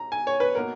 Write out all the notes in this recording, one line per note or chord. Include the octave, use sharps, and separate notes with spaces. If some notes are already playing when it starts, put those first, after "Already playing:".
Already playing: A#5
G#5
C#5
B4
B2 A#3 A#4